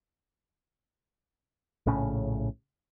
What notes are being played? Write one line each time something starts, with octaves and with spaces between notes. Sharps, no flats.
A#1 A2 C#3 C#4